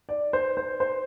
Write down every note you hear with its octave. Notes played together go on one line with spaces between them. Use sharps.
D5
C5
C5
C5